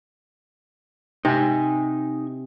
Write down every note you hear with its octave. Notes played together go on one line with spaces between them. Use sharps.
C3 D#4 G#5